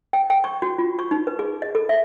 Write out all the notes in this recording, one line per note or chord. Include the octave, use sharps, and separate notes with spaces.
G5
G5
C#6
F#4
F4
C#6
D#4
B4
G#4
D#5
A4
E5